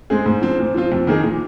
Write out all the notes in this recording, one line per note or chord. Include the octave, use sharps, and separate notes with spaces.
G#3 C4 G#4
G#2
F3 C4
A#2
F3 C4 F4
F2
D#3 A#3 D#4 G#4
A#2